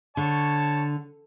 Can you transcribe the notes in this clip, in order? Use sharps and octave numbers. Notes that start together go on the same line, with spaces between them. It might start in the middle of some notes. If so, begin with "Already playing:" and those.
D3 C#5 A5